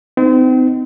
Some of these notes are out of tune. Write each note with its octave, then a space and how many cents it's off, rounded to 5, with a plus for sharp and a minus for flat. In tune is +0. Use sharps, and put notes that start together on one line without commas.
C4 -35 D#4 +0